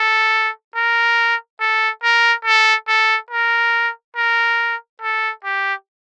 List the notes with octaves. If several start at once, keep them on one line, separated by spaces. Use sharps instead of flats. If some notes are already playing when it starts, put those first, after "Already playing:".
Already playing: A4
A#4
A4
A#4
A4
A4
A#4
A#4
A4
G4